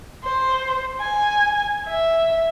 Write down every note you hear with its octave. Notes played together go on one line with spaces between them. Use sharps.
C5
G#5
E5